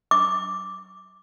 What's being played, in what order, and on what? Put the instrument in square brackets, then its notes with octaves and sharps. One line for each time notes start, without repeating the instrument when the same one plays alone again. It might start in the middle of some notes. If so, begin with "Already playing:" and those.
[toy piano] D6